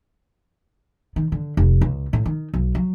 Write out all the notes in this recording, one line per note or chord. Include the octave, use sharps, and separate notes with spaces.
D#3
D3
F1
C#2
A2
D#3
B1
F#3